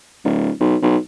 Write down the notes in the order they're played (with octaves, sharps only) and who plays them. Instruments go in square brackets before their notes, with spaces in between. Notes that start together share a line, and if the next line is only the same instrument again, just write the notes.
[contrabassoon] D1
B1
B1